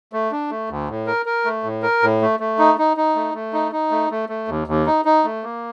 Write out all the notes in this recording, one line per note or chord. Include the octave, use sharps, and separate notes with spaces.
A3
D4
A3
D2
A2
A#4
A#4
A3
A2
A#4
A2
A3
A3
D#4
D#4
D#4
A3
A3
D#4
D#4
A3
A3
A3
D#2
D#2
D#4
D#4
A3
A#3